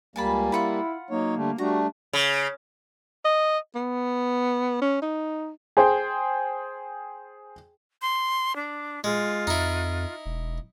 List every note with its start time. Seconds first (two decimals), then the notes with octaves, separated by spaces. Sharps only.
0.16 C#2 G3 A#3 G#5 A5 B5
0.52 E4 F4 F#5 B5
1.10 F#3 A#3 D#4 C#5
1.36 D3 G3 A3
1.58 G3 A3 D4 F#4 A#5
2.13 C#3
3.25 D#5
3.75 B3
4.82 C#4
5.02 D#4
5.77 G#4 C5 G5
8.02 C6
8.56 D4
9.04 G#3 F4
9.47 F2 D#4 E4
10.26 E1